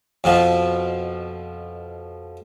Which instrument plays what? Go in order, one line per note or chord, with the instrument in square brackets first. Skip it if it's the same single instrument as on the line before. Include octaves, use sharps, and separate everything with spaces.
[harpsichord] F2 B2 F3